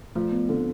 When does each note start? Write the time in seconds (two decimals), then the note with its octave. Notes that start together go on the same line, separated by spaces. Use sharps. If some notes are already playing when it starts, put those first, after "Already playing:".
0.15 F3 A3
0.32 B3
0.49 D3 C4